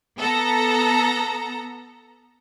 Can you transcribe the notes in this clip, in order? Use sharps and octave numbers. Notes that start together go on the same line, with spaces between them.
B3 A4 A#5